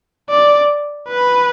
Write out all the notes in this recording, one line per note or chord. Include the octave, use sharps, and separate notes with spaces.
D5
B4